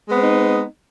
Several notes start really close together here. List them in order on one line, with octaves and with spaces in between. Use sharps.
G#3 B3 C4 D#4